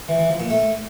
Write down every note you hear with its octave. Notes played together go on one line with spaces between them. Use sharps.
E3
E3
F3
A#2
A3